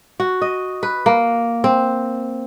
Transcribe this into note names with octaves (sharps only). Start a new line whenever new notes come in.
F#4
D#5
B4
A#3
C4